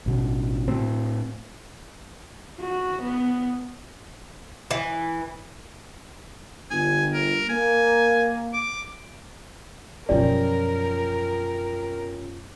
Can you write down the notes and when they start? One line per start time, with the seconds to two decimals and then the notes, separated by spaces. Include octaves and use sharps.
0.06 A1 B2
0.68 A2 C4
2.60 F#4
3.03 B3
4.71 E3
6.71 G1 G#5
7.13 A#4
7.50 A#3 G#5
8.54 D6
10.09 F#2 B2 F3 C#4 G4 A#4 D5